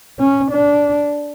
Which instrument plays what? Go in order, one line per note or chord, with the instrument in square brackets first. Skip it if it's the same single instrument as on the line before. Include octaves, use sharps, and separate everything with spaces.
[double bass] C#4
D4